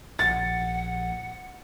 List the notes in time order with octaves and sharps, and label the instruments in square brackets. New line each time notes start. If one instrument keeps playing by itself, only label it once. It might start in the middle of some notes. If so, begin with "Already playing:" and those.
[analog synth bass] A#1 [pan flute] F#5 [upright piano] A6